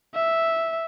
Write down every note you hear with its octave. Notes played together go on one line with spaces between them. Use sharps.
E5